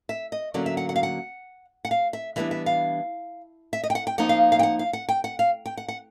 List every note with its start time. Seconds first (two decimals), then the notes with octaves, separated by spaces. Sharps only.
0.09 E5
0.32 D#5
0.54 D3 F#3 A#3 C#4 D5
0.66 E5
0.77 F#5
0.89 F#5
0.96 F5
1.03 F#5
1.85 F#5
1.91 F5
2.13 E5
2.36 E3 G3 B3 D4 E5
2.51 E5
2.66 F5
3.73 E5
3.84 D#5
3.90 G5
3.95 F#5
4.07 G5
4.18 F3 A#3 D#4 F#5
4.29 F5
4.52 F5
4.59 G5
4.63 F#5
4.79 F5
4.93 F#5
5.09 G5
5.24 F#5
5.39 F5
5.66 G5
5.77 F#5
5.88 F#5